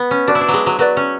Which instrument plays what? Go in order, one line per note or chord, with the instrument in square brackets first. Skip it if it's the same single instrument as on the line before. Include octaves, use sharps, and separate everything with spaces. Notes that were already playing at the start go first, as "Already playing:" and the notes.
Already playing: [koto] B3
C#4
[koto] D4 [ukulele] F#4 B4 D5
[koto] E4
D4
F#3 G#3
F#3
[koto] F#3 [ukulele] F#4 B4 D5
[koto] C#4